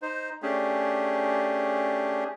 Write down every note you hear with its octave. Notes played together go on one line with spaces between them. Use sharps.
D#4 C5
A3 C#4 D4 G4 G#4